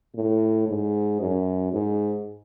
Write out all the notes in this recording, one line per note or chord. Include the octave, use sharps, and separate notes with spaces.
A2
G#2
F#2
G#2